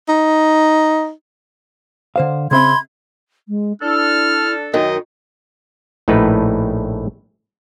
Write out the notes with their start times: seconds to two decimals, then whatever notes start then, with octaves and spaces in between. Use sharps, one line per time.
0.09 D#4
2.16 D3 C5 F5
2.51 C#3 C4 E5 B5 C6 G#6
3.48 G#3
3.82 D4 E4 A4 F6
4.74 F#2 D#3 D#4 D#5
6.08 A#1 A2 A3 D#4 B4